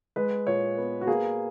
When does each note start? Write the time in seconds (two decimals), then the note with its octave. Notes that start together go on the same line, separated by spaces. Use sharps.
0.16 G#3 B4
0.47 A#2 C#5
0.78 B3
1.01 F#4
1.07 A#3 G#4